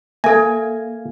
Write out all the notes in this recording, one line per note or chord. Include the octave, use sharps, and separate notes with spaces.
A#3 A4 E5 F5 G#5 G#6